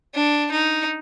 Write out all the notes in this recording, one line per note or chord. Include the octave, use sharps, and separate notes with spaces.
D4
D#4